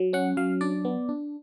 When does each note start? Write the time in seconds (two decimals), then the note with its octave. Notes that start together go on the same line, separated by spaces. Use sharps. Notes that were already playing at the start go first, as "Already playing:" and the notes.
Already playing: F#3
0.13 C#4 F#5
0.37 F#3 F5
0.61 D4 D5
0.85 B3
1.09 D4